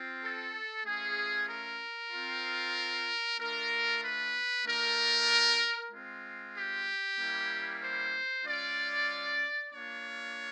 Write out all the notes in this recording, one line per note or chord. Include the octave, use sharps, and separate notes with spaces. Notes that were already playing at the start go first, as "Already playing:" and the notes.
Already playing: C4 F4
A4
A3 C#4 F4 G#4
A#4
C4 F4
A3 D4 F4 A#4
B4
A3 D4 G4 A#4
G#3 C4 F4
G4
G3 A#3 C#4 E4
C5
G#3 C#4 F4 D5
A#3 D4 F4 C#5